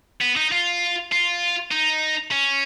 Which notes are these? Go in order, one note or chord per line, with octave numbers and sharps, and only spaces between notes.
B3
D#4
F4
F4
D#4
C#4